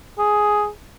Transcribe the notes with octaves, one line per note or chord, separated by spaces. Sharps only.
G#4